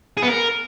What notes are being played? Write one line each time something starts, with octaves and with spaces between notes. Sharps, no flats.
G#4
B3
A#4